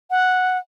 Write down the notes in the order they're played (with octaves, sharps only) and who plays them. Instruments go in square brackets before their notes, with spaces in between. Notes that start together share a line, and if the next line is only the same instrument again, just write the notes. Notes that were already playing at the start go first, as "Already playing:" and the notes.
[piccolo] F#5